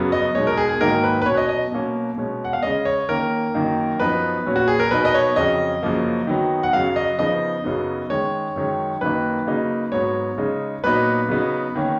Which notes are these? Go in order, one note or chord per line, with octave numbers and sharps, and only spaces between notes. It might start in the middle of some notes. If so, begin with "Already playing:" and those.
Already playing: F#2 C#3 F#3 B3
D#5
B2 G#3 D#4 C#5
A#4
G#4
G#4
G#2 D#3 F#3 A#3 D#4 A#4
B4
B4
B2 F#3 C#4 C#5
D#5
D#5
B2 F#3 A#3 C#4
B2 G#3 C#4
F#5
F5
C#3 G#3 C#4 D#5
C#5
D#3 A#3 C#4 A#4
F#2 D#3 A#3 D#4
F#2 F3 B3 D#4 B4
A#2 F#3 C#4
F#4
G#4
A#4
B2 F#3 B3 D#4 B4
D#5
C#5
F2 C#3 F#3 C#4 D#5
F#2 C#3 F3 A#3
D#3 F#3 B3
F#5
F#2 C#3 F#3 F5
D#5
C#3 F3 B3 D#4 D#5
F#2 C#3 F#3 B3 D#4
D#3 G#3 C#4 C#5
F#2 D#3 G#3 C#4
F#2 D#3 A#3 D#4 B4
C#3 F#3 A#3 D#4
G#2 F#3 B3 C#5
C#3 G#3 D#4
A#2 F#3 B3 D#4 B4
C#3 F#3 B3 D#4
D#3 A#3 C#4